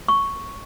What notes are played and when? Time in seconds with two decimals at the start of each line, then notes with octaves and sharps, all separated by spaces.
0.08 C#6